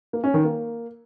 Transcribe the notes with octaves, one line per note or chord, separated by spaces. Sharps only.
A#3
C#4
D#3
A#3